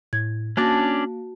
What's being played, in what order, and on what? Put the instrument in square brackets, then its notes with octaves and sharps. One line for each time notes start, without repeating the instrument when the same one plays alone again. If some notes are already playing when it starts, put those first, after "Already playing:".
[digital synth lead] A2 [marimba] G#6
[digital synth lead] A#3 [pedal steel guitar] C#4 D4 D5 [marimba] F#4 A5 A#6